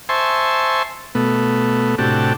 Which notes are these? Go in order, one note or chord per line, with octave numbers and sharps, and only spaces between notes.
C5 E5 G#5 A5 C6 C#6
B2 A3 B3
A2 C3 D4 F#4 G4 A5